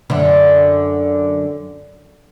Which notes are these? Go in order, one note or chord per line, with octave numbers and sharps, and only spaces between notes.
F#2 D3